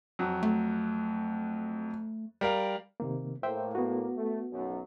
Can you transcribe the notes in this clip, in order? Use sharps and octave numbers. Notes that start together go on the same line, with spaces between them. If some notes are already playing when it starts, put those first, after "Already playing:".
F2 F#3
A3
G3 A#4 F5
C3 D#3 A#3
A2 A#3 C5 E5 G5
B3 F#4
A3
B1 F#2